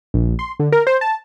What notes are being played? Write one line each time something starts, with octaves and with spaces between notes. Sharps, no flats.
A#1
C6
D3
A#4
C5
A5